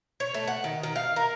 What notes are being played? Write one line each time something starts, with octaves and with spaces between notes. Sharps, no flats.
C#5
A3
F#5
D#3
D#3
F5
A#4